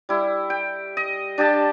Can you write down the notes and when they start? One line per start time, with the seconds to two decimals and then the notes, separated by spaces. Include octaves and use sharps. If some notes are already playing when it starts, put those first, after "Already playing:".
0.09 G3 E4
0.50 G5
0.97 D#5
1.38 D4 G4 D#5 A5